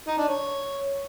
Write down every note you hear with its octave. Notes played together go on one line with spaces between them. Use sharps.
D#4
D4
C#5